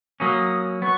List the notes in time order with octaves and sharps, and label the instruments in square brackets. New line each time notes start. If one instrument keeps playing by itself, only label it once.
[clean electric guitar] F#3 A#3 C#4 [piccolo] D#6
[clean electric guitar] F#3 B3 [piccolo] C#6